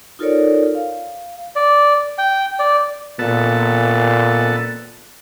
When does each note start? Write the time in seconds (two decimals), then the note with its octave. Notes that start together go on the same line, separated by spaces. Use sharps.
0.19 D#4 F4 A4 A#4 C#5 D5
0.75 F5
1.56 D5
2.18 G5
2.59 D5
3.19 A#2 B3 A4 A5